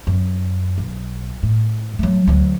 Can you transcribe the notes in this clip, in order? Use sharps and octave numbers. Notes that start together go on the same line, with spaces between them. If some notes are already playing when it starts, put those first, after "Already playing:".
F#2
B1
A2
F#3 A3
D2 F#3